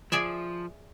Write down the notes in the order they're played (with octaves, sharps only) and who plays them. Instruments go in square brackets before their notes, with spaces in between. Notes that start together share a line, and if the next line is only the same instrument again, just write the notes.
[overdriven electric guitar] F3 [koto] G#4 D5 E5